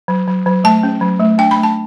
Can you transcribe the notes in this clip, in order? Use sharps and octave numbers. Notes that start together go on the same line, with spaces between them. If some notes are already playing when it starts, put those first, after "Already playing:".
F#3
F#3
F#3
A3 A5
C#4
F#3
A3
D4 G5
B5
A3
A5